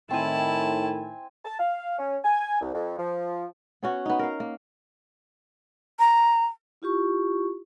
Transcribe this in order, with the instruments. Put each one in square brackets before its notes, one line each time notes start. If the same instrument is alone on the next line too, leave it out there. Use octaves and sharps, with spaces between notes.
[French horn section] A2 D#3 [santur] C4 G#5 [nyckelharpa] E4 A5
[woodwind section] A5
F5
C#4
G#5
C2
F2
F3
[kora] B3 C#4 F#4
B3 D#4
A#4 F5
A#3
[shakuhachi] A#5
[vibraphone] E4 F4 G4 C#6